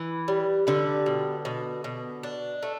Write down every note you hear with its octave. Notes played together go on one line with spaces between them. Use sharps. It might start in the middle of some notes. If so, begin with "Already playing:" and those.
Already playing: E3
G3
D3 G3
B2
B2
B2
D4
A3